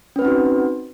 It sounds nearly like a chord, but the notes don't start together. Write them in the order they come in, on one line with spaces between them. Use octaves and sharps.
C#4 B4 C4 D#4 F#4